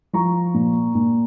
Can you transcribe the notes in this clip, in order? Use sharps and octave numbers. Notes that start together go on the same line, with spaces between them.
F3 A#5 C#6
A#2
A#2